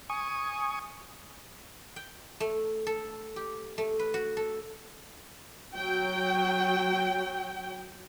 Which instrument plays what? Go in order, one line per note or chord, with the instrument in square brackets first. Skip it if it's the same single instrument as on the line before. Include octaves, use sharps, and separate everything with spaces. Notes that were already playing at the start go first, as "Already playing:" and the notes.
[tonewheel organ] G#5 C#6 D#6
[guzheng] G5
A3
A4
G4
A3
B4
F#4
A4
[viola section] F#3 G5